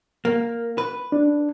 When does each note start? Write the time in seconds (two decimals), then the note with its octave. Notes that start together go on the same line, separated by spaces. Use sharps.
0.25 A#3
0.78 B4
1.12 D4